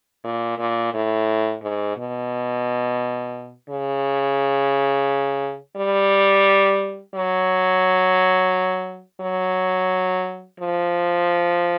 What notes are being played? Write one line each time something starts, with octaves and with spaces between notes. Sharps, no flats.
A#2
A#2
A2
G#2
B2
C#3
G3
F#3
F#3
F3